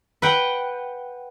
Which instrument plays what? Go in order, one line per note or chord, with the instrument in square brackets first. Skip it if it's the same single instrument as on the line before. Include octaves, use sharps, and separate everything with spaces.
[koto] B4 F#5 G5